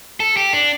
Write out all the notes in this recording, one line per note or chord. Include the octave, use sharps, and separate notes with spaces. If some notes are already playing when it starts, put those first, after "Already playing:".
A4
G4
D4